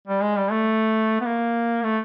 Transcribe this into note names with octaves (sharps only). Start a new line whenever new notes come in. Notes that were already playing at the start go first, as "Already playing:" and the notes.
G3
G#3
G3
A3
B3
A#3
A3